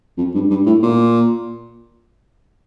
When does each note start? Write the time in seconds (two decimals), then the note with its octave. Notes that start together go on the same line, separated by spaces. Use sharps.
0.17 F2
0.34 G2
0.50 G2
0.66 A2
0.82 A#2